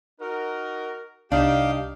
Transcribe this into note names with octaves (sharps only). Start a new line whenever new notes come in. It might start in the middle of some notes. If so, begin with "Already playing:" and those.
D#4 F#4 A#4
C2 D4 D#4 G4 F5